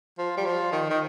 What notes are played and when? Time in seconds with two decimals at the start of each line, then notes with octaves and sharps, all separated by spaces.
0.18 F3
0.37 G3
0.45 F3
0.72 D#3
0.89 D#3